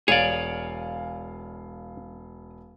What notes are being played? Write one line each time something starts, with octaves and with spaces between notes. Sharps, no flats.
E1 G#4 C#5 D5 F5